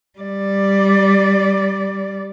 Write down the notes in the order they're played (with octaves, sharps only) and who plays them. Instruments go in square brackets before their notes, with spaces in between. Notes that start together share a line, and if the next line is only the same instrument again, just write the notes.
[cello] G3 D5